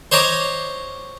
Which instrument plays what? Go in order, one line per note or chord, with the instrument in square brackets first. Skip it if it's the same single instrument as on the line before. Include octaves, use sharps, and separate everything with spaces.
[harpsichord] C5 C#5 D#5 A#5 D6